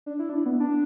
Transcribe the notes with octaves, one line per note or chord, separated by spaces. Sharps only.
D4
E4
D4
B3
D4